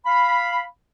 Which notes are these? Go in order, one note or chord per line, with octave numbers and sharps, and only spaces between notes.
F5 B5